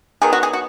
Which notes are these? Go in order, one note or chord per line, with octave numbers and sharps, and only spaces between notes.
D#3 F#3 B3 G#4
F#4
G#4
F#4